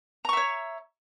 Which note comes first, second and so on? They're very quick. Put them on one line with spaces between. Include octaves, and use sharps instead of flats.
A#5 C#6 E5 C#5